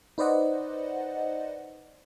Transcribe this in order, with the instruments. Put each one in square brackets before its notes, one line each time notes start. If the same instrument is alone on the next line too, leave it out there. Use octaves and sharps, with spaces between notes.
[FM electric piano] D#4 B4 C5 D5 D#5 F#5